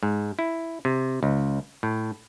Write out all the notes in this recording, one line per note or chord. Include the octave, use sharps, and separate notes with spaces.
G#2
E4
C3
C#2
A2